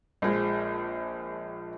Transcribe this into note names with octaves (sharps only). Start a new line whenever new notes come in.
A#1 F3 G#3